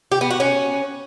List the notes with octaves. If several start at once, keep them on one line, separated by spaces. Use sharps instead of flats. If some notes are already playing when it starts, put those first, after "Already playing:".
G4
B3
F#4
C#4